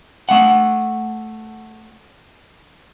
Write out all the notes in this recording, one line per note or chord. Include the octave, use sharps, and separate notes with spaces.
A3 F#5